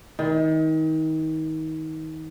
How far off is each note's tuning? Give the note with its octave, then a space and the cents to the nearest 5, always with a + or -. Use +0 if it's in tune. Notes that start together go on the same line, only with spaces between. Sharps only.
D#3 +30